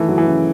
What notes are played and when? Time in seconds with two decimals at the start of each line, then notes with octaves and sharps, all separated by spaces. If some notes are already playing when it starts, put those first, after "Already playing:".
Already playing: D#3 E3 A3
0.08 F#3
0.18 E3
0.27 C#3